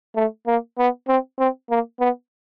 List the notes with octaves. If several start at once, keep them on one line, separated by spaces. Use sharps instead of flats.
A3
A#3
B3
C4
C4
A#3
B3